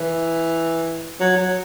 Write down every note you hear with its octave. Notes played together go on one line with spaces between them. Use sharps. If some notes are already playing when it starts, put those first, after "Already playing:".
Already playing: E3
F#3
F#3